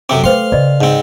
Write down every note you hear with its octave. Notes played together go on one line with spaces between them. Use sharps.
F#2 C3 C4 A4 G5 D6
A3 B4 C5 F5 G5 C6
C#3 D5 D#5
G#2 C4